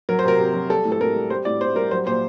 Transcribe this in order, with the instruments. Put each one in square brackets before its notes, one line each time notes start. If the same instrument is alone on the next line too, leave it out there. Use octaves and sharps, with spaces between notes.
[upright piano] F#3 A#4
C5
C3 A#4
C3
F#3
G3 A4
A2
A4
A2 A#4
G3
G3 C5
A2 D5
A2 C5
G3 A#4
F#3 C5
A#2 C5